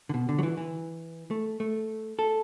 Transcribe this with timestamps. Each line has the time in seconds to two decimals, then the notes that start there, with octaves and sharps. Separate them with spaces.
0.09 D3
0.14 B2
0.29 D3
0.39 F#3
0.43 E3
0.57 E3
1.31 A3
1.60 A3
2.19 A4